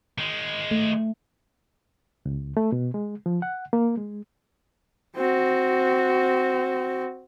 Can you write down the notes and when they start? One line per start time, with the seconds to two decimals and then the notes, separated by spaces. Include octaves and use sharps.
0.18 D#3 G#3
0.71 A3
2.26 C#2
2.57 A3
2.72 B2
2.94 G#3
3.26 F3
3.42 F#5
3.73 A#3
3.97 G#3
5.16 C4 F#4